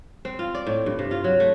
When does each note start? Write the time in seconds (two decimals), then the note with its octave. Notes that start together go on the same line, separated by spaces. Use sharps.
0.25 C4
0.39 F4
0.55 D5
0.67 A2
0.86 G2
0.99 C3
1.11 F4
1.24 F#3
1.40 A3